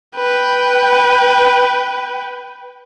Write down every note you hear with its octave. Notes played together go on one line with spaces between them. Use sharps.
B4 G5